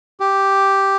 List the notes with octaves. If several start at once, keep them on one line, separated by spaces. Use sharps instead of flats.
G4